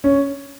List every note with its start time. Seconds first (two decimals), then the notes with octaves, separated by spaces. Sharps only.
0.04 C#4